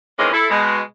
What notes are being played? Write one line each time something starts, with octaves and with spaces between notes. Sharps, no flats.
D#3 E3 G#3 A#3 C4 C#4
E4 A4
B2 G#3